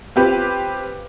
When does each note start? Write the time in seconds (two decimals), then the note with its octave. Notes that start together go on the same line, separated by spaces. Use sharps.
0.16 C4 F4 G4 B4